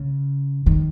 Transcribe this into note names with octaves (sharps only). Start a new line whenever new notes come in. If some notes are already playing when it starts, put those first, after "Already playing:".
Already playing: C#3
D#3